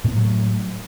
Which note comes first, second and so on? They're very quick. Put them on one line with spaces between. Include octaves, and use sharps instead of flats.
A2 B3 A3 F#3